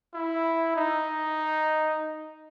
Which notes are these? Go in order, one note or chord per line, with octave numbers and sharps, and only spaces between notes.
E4
D#4